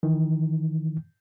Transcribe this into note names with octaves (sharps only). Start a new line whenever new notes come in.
D#3 E3